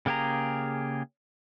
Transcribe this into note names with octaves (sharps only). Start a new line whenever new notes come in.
C#3 A#3 G4 G#4 A#5